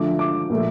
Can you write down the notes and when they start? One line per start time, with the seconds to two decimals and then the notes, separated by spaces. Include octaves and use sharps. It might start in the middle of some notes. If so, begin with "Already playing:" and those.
Already playing: D3 F3 A3 D6
0.19 D6
0.50 A#2 F3 A3